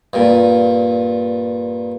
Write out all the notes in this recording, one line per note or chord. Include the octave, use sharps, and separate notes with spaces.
G2 A#2